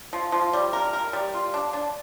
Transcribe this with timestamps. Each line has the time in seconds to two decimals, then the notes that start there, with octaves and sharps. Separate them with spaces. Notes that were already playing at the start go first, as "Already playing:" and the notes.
0.13 F3
0.32 F3
0.53 G3
0.73 A#4
0.93 A#4
1.13 G3
1.34 F4
1.54 D4
1.73 D4